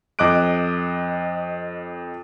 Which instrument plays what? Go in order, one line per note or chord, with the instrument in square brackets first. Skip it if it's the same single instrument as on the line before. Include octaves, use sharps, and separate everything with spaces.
[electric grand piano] F2 D#5 D6 F#6 D7